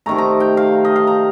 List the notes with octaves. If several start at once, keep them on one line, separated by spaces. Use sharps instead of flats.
C3 D#3 A3 A#5
A#5
G5
F5
D#5
F5
A#5